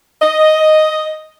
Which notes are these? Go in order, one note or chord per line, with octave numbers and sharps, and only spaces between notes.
D#5